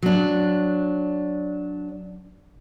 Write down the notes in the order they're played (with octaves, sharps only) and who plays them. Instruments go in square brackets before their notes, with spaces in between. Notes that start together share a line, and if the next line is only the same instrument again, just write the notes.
[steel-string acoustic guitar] F#3 D4